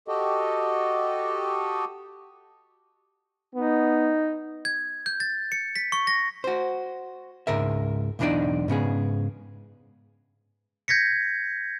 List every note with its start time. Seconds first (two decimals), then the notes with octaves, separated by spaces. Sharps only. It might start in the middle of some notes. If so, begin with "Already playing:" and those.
0.08 F#4 G4 A4 D#5
3.55 B3 D#4
4.65 G#6
5.06 G6
5.20 A6
5.52 C#7
5.76 B6
5.92 C#6
6.07 A#6
6.44 F#4 C5
7.47 C#2 G#2 A#4 E5
8.19 B1 E2 E3 D4 D#4 D5
8.68 G#2 C#3 B3 G#4
10.88 G6 G#6 A#6 B6 C#7